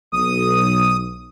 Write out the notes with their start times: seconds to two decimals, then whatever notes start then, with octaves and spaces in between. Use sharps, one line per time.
0.13 B1 D#6